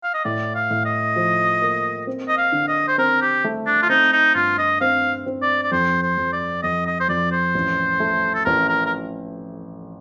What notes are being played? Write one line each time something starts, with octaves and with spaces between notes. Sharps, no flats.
F5
D#5
A2 D5
F5
A2
D#5
F3
A#3
C4
D#5
F5
D3
D#5
C5
C4 A#4
G4
A3
D4
F4
C4 D#4
D#4
G2 F4
D#5
C4 F5
C4
D5
D5
F2 C5
C5
F2
D5
F2 D#5
D#5
C5
F2 D5
C5
A1
A3
A4
A1 A#4
A#4
A#4